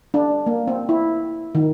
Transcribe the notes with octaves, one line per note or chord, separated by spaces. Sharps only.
D4
A#3
C4
E4
D#3